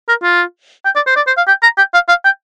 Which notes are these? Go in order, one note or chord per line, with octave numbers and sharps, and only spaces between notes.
A#4
F4
G5
D5
C5
D5
C5
F5
G5
A#5
G5
F5
F5
G5